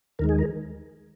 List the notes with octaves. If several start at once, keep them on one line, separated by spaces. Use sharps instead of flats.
D#2 D#3 G#3 A#4
G#4
A#4